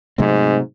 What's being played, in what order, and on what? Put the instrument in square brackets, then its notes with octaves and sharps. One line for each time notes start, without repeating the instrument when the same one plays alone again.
[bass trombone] G#2 [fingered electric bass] C3 F#3 A3 C4